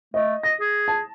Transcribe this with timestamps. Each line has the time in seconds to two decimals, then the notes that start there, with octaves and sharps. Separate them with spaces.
0.14 A3 D#5
0.43 D#5 A#6
0.61 G#4
0.88 A5